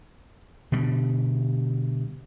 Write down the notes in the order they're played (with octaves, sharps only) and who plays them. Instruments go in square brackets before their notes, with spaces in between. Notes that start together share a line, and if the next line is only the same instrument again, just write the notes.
[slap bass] B2 D3 G3